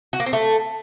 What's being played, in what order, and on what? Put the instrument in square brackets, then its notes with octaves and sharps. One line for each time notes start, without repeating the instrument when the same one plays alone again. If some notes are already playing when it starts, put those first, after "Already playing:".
[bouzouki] F#4
A#3
C4
A3